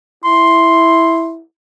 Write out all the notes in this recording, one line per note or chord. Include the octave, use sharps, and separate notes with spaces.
E4 C6